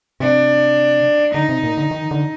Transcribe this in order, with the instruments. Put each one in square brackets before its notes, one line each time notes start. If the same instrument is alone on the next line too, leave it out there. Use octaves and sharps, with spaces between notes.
[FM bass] C3 [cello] D4
[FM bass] D3 [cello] D#4
[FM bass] C3
A#2
D3
D#3
D3